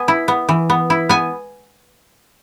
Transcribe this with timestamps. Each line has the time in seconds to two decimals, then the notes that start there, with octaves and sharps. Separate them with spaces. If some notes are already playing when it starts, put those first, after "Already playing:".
Already playing: B3 G#5
0.08 E4
0.28 B3
0.49 E3
0.70 B3
0.90 E4
1.09 B3 G#5